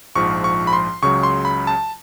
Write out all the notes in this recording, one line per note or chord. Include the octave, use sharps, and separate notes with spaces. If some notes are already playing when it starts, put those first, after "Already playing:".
A#1 G#2 F3 C#6
C#6
B5
C6
C#2 C#3 F#3 C#6
C6
B5
A5